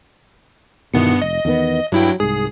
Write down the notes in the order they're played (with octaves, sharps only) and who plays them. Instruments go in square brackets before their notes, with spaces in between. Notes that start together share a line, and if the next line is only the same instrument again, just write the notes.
[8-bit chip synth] G2 B3 C#7 [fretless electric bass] B2 D#3 E3
[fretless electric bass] F1 [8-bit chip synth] D#5
[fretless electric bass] E2 D#3 B3
[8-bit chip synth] G2 E4 G5 [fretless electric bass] F#3
[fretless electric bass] C2 G#2 [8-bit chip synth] G#4